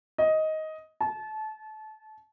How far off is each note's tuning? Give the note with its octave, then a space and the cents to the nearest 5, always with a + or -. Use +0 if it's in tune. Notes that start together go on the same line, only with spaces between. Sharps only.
D#5 +10
A5 -25